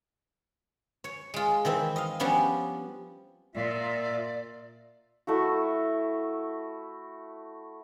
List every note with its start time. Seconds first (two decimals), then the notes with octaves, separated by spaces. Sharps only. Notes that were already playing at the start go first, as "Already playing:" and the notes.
1.04 C#5
1.34 G#3 F4
1.65 D#3 E3 C4 E5
1.96 D#5 F5
2.20 F3 G3 B3 C#4 D4
3.55 A#2 F4 D5 E5
5.27 A3 E4 F#4